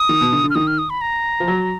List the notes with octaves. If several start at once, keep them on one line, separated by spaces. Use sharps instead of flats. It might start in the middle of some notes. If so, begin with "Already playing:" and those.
Already playing: D#6
D#3
B2
D3
D3
F6
D#3 D#6
F6
D#6
B5
A#5
F3
F#3